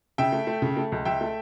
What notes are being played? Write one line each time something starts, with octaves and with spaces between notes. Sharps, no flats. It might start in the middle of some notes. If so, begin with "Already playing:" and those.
C#3 E5 G5
A3
A3
C#3
A3
C#2
C#2 E5 G5
A3